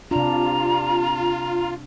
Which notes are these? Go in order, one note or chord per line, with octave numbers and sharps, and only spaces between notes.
C3 D4 F4 A#5